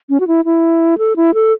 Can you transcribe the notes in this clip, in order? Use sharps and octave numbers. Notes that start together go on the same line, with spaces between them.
C#4
F#4
E4
E4
A4
E4
A4